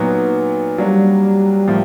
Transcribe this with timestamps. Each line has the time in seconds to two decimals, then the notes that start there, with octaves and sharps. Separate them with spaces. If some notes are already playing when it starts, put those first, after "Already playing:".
Already playing: A#2 F#3 B3 D#4
0.78 F#3 G3 A#3 D4
1.67 A2 F3 A#3